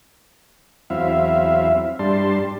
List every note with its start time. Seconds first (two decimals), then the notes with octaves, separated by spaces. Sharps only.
0.90 E2 F#3 C4 E4 E5 F5
1.99 G2 G3 D4 A5 C6